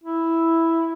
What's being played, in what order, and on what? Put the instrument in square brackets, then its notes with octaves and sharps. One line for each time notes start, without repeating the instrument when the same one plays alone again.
[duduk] E4